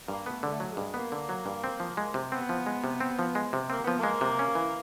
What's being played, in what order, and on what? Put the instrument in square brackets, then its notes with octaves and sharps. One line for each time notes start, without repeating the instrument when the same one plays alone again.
[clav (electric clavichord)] G2 [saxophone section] A#3
[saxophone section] A3 [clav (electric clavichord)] B3
[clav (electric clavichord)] D3 [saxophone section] G#3
[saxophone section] A3
[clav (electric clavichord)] F#3
[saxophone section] G#3
[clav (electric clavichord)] G2
[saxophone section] A#3 [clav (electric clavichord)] B3
[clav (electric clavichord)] D3
F#3
G2
C4
F3
G#3
C3
[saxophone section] B3 [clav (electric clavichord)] C4
[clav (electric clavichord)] F3
G#3
C3
C4
F3
G#3
C3
[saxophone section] A#3 [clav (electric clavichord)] C4
[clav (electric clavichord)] F3 [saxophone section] B3
[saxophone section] A#3
[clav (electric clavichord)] G#3
C3
C#4
E3